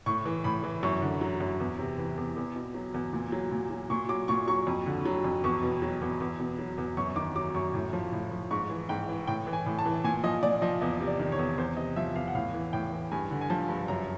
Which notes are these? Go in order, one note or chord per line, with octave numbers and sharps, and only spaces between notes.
A2 C#6
E3
A2 B5
E3
F#2 C#6
D3
F#3
F#2
E2
C3
E3
E2
E2
B2
F#3
E2
A#2
F#3
A#2
F#3
A#2 C#6
F#3 D6
A#2 C#6
F#3 C#6
F2
D3
F#3
F2
E2 C#6
B2
F#3
E2
E2
B2
F#3
E2
F#2 C#6
D#3 D6
F#3 D6
F#2 C#6
A2
F3
A2
F3
G#2 C#6
E3
G#2 G5
E3
A2 G5
E3
G#5
A2
A5
E3
A#2 G#5
F3 D#5
A#2 D5
F3 D#5
E2 D#5
C3
D5
D#3
C#5
E2
E2 C5
C3 D#5
F3 E5
E2 F5
F#5
A2 F5
E3
A2 G5
E3
G2 G#5
D3
G#5
F3 A5
G2
F#2 A#5